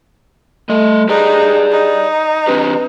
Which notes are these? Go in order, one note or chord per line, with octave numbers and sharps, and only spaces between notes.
G3 A3 D#5
D#4 G4 G#4 B4 D5
D#4
C4 D4 G4 B4